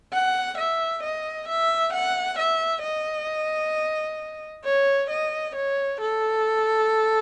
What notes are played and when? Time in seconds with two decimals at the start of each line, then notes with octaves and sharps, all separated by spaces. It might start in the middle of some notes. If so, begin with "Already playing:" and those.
0.13 F#5
0.58 E5
1.03 D#5
1.49 E5
1.93 F#5
2.39 E5
2.84 D#5
4.65 C#5
5.10 D#5
5.55 C#5
6.00 A4